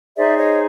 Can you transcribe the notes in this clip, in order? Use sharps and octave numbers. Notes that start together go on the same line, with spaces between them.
D#4 G#4 C5 D5 E5
C#5 D#5